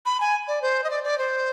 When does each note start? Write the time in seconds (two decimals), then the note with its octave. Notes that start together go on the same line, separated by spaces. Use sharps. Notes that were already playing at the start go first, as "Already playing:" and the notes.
0.06 B5
0.20 G#5
0.48 D5
0.62 C5
0.84 D#5
0.90 D5
1.04 D5
1.18 C5